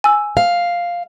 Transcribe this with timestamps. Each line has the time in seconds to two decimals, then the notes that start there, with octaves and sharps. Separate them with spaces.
0.04 G#5 E6
0.37 F5